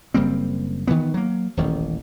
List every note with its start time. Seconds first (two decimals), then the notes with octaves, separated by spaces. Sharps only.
0.14 F#1 G3 A#3 C4
0.87 D#3 E3 B3
1.14 F#3 A#3
1.57 D#1 A1 D#3